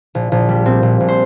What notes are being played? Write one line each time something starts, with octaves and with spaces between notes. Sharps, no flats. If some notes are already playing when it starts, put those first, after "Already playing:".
A#1
A#1
G3
A#2 C4
A#1
A#1
C5